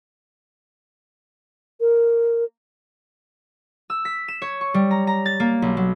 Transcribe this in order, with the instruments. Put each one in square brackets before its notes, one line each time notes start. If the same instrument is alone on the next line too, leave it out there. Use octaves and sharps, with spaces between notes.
[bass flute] A#4
[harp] E6
B6
E7
C#5
C#6
G3
A#5
A#5
A6
A#3
B1
F#3